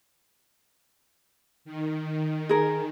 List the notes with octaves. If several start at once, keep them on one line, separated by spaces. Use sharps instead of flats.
D#3
G#4 A#4